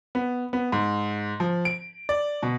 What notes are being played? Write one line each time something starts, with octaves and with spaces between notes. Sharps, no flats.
B3
B3
G#2
F3
D7
D5
B2